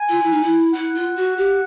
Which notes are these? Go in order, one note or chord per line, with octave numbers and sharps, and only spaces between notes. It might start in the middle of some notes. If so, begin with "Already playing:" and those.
Already playing: G#5
F4
E4
D#4
E4
E4 F#5
F4
F#4
G4